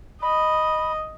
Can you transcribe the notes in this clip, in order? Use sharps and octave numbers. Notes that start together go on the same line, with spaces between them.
D#5 B5